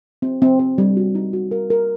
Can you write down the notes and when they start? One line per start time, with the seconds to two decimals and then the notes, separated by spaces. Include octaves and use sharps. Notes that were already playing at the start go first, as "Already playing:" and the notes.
0.22 C4
0.42 C4
0.59 C4
0.78 G3
0.97 F#4
1.15 D#4
1.33 F#4
1.51 A#4
1.70 A#4